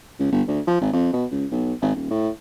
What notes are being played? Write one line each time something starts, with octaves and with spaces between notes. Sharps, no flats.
C#2
G1
D2
F3
G#1
F2
B2
C#2
B1
G#1
D#1
A2